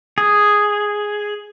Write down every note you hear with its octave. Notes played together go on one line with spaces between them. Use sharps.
G#4